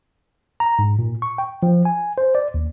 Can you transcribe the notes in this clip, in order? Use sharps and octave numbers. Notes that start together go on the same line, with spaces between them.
A#5
G#2
A#2
C#6
G5
F3
G#5
C5
D5
D#2